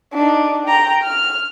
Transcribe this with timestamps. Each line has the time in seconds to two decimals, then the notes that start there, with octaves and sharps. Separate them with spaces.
0.13 D4 D#4
0.66 G5 A#5
1.04 F6